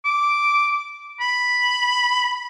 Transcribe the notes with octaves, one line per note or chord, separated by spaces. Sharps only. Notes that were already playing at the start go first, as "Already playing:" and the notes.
D6
B5